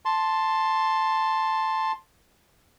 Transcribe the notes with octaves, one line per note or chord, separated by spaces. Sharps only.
A5 C6